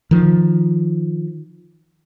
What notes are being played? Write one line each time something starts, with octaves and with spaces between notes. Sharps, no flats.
D#3 F3